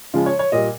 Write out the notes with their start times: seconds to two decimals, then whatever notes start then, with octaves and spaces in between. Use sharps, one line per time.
0.14 C#3 F3 G#3 F4
0.26 C#5
0.39 C#5
0.52 A#2 G3 D#5